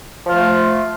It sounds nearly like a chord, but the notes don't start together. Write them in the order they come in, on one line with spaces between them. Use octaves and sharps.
F3 F4 A3